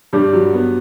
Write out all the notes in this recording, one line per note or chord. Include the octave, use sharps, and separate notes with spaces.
G2 G3
F#3
B3